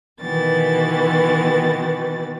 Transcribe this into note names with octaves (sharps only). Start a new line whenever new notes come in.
B2 D#3 E3 B3 A6